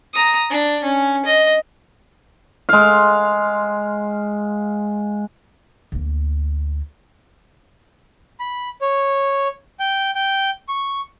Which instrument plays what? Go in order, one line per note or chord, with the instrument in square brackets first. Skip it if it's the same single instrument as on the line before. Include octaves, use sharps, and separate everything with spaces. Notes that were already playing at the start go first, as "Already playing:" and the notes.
[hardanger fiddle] A#5 D#6
D4
C#4
D#5
[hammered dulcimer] G#3 F5
[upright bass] D2 A#3
[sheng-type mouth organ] B5
C#5
G5
G5
C#6